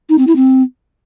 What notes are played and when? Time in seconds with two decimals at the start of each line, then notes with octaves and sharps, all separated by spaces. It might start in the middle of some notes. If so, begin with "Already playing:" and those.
0.09 D#4
0.18 C4
0.27 E4
0.36 C4